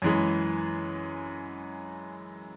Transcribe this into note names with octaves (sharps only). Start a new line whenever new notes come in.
F#2 E3 G#3